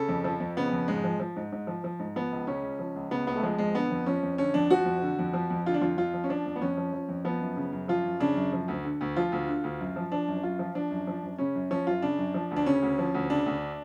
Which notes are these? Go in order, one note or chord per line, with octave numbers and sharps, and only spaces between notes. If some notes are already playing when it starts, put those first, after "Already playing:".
Already playing: C#3 A4
F2
F3
F2
C#3 B3
F2
G#2 G#3
F3
F3
G#2
G#2
F3
F3
G#2
F3 B3
C#2
C#3 C#4
C#2
F3
C#2
C#3 B3
C#2 B3
A3
F3 G#3
F2 G#3
D3 B3
F2
F3 C#4
F2
D3 C#4
F2 D4
F3 F#4
F2
D3
F2
F3
F2
D3 F4
D4
F2 F4
F2 F4
F3
C#4
F3 D4
F2
B3
F2 C#4
F3
F3
F2
F3 B3
F#2
C#3
F#2
F3 F4
F#2
C#3 D4
F#2
F3
D2
D3
D2
F3 F4
D2
D3
D2
F#2
F3
F3 D4
F#2
F#2 F4
F3
F3 D4
F#2
F3
F#2
C#3 C#4
F#2
F3 C#4
F#2 F4
C#3 D4
F#2
F3
D2
D4
C#3 C#4
D2
F3
D2
C#3 D4
D2